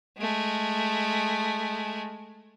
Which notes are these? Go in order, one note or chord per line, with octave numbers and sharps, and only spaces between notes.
G#3 A3